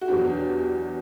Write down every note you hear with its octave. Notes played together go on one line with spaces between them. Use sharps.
F#4
E2 B2 F#3 B3 D4 G4